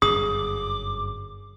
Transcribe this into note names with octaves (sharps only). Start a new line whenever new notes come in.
G1 F#2 G#4 D6 D#6